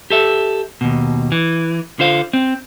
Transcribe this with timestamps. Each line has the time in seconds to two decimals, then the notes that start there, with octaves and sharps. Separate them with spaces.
0.10 G4 A4 E5
0.81 D#2 B2
1.32 E3
1.99 D3 F4 C5 F5
2.33 C4